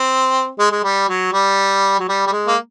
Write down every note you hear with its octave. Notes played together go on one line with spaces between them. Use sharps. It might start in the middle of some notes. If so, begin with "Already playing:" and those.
Already playing: C4
G#3
G#3
G3
F#3
G3
F#3
G3
G3
G#3
A#3